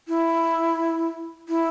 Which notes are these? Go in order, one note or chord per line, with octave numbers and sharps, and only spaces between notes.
E4
E4